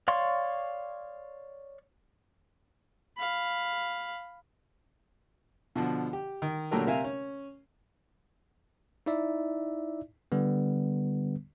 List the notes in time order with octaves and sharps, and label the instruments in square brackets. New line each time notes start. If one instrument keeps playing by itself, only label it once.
[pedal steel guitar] C#5 D5 F5 C6 C#6
[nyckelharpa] F5 B5
[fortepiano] B2 D3 F3
G4
D#3
A#2 D3 F#3 A3 G4 A#4
C3 A#4 E5 F5 G#5
C#4
[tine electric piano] D#4 E4 D5 E5
D3 G3 B3